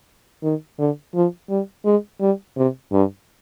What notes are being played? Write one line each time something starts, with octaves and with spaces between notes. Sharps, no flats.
D#3
D3
F3
G3
G#3
G3
C3
G2